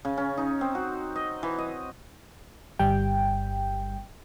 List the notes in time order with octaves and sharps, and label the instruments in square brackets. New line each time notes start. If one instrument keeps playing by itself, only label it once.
[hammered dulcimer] C#3
C#4
D#4
C4
F#4
D#5
E3
D#5
[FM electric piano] G1 G3 G5